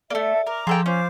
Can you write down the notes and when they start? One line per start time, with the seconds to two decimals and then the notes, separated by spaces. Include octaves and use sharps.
0.10 A3 A#3 A4 D5 E5
0.47 A#4 A#5 D6
0.67 F3 G#4 A4 G5
0.86 C#4 F4 C5 D6